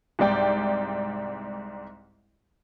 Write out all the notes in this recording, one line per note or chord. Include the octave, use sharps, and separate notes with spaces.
C2 G#2 D5 G5